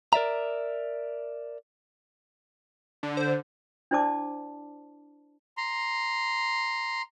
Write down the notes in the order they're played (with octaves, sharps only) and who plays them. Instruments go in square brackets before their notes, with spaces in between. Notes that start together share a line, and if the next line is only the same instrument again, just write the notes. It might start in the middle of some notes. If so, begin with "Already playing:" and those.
[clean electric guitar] A#4 D5 E5 A#5
[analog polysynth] D3
[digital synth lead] C5
[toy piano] D4 E4 C5 D5 A5 D6
[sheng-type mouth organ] A#5 C6